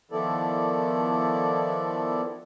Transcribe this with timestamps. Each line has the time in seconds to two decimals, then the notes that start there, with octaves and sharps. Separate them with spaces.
0.11 D#3 F3 B3 E4 A4 D5